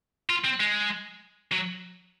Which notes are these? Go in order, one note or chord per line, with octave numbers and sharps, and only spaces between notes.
F4
C4
G#3
F#3